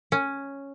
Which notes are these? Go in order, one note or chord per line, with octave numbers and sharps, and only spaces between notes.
C#4